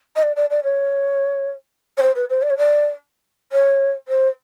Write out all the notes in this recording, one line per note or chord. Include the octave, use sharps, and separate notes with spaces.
D#5
D5
D5
D5
C#5
C#5
C5
B4
C5
D5
C#5
D5
C#5
C5